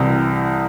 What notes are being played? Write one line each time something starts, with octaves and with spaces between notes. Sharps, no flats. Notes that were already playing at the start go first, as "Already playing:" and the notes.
Already playing: C2 C3 E3 D#6